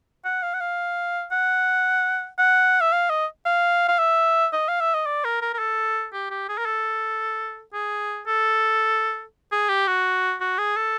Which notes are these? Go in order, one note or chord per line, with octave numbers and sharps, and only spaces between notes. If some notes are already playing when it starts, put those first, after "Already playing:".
F#5
F5
F#5
F5
F#5
F#5
E5
F5
D#5
F5
F5
E5
D#5
F5
E5
D#5
D5
A#4
A#4
A#4
A4
G4
G4
G#4
A#4
A4
G#4
A4
G#4
G4
F#4
F#4
G#4
A4